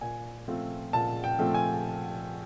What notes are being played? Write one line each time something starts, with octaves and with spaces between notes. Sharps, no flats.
A#2 G#5
F3 A3 C4 F4
A#2 A5
G5
F3 A3 C4 F4
G#5